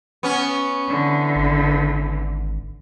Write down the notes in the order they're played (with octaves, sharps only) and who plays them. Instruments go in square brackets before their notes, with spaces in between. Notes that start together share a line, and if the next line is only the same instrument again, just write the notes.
[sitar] B3 C#4
[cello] D3 E3
[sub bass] G#1